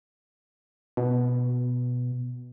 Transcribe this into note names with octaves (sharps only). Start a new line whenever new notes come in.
B2